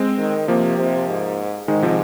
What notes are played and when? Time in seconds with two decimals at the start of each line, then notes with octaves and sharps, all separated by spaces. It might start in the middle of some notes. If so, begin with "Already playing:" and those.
Already playing: G#3 C4
0.18 D#3
0.48 C3 F3 A#3
0.78 C3
1.08 G#2
1.68 G#2 D#3 G#3
1.82 C3 F3